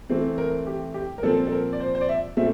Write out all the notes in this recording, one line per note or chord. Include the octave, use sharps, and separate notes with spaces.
E3 A3 C4
A#4
G4
G4
A#4
A#2 F3 C4 A4
A4
A#4
D5
C5
C5
D5
E5
A#2 A3 C4 E5